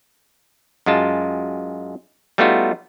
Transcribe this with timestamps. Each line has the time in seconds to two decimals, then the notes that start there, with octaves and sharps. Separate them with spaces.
0.86 F#2 G#3 F4 A5
2.38 G3 A3 B3 D#4 F4 F#4